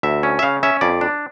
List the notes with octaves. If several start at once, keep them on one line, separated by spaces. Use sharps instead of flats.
D2 E5
C#4
E5
C#3 F5
C#4 E5
F2 D5
D4